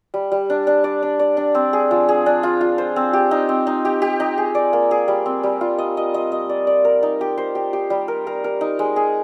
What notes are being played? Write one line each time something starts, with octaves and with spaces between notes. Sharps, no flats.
G3
G3
D4
D4
D5
D4
D5
D4
C4
G#4
F3
G#4
D4
F4
F4
C5
C4
G4
D#4
C4
D#4
G4
G4
D#4
G#4
D5
A#3
G#4
G3
C4
G3
F4
D#5
D#5
D#5
D#5
D5
D5
A#4
D#4
G4
C5
G4
G4
G3
A#4
A#4
A#4
D#4
G#3
G#4